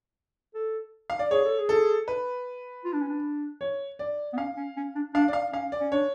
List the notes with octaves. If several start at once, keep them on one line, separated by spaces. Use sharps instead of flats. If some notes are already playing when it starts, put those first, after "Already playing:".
A4
F5
D5
G#4 C#5
A4
G#4
A4
B4
F4
D4
C#4
D4
C#5
D5
B3
C#4 F5
C#4
C#4
D4
D4 F5
D5
F5
C#4 F5
D5
C#4
D4 C#5